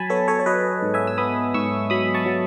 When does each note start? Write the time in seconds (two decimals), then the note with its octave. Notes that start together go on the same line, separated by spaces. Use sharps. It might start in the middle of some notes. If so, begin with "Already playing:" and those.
Already playing: F#3 G#5 A5 B5
0.10 B3 A4 C#5
0.28 A4 C#5
0.39 C#5
0.46 F#3 B4 D#5
0.82 G#2
0.94 E5 G#5
1.07 E6
1.18 B3 B5 D#6
1.54 G#2 C#6 E6
1.90 F#3 B5 D#6
2.14 A5 C#6
2.26 F#3